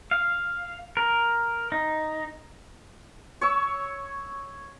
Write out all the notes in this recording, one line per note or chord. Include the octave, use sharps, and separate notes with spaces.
F5
A#4
D#4
C#5 C#6 E6